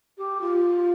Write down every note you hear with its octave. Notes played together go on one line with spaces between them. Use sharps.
G4
F4